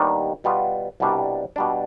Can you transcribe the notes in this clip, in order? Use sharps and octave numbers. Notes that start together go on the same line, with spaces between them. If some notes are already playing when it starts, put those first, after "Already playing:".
Already playing: D#2 D#3 G3 B3 D4
B2 G3 B3 F4
C2 B2 G3 D4
B2 G3 D4